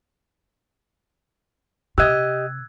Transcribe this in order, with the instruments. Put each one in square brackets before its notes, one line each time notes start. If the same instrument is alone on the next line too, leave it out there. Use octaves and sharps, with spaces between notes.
[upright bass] C3 [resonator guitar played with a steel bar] G4 D#5 [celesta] E6 F#6 G#6